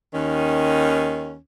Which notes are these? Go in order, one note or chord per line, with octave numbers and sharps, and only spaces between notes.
D#2 D#3 C#4